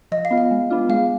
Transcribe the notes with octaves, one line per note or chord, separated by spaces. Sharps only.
F3 D#5
F5
B3 F4
F5
G#3
B3 D4 F4
G#3 F5